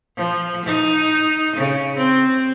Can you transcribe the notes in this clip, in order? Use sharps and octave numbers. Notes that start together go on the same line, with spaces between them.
F3
D#4
C#3
C4